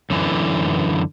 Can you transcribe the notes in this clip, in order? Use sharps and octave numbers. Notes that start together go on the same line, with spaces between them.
F#2 D3 E3